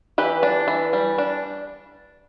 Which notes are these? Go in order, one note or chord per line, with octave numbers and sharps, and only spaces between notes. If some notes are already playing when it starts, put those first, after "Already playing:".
E3 G4 B4
D4
E3
G3
D4